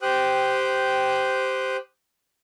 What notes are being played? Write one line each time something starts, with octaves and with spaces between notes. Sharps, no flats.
G4 C5 G5 D#6 F#6